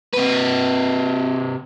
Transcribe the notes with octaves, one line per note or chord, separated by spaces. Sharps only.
C3 B4